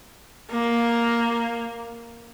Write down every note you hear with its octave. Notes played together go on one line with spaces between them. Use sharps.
A#3